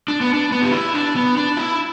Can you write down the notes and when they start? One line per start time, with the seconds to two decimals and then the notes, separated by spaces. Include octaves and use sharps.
0.08 D4
0.21 B3
0.34 D4
0.52 B3
0.62 G4
0.72 E4
0.94 D4
1.16 B3
1.37 D4
1.57 E4